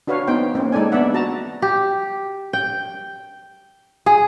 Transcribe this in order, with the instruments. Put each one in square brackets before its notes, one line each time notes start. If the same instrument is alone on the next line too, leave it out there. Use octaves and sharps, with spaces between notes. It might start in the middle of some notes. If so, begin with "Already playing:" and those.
[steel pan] D4 F#4 B4 C#5 F5
B3 D#4 C5 G5
A#3 C4 C#4
G#3 D#4 A4 D5 G#5
B3 D4 D5 E5 F#5
F#4 A5 A#5
[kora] G4
G5
G#4